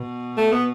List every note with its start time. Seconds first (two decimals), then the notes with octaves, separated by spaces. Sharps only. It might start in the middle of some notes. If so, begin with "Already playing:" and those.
Already playing: B2
0.37 A3
0.52 B3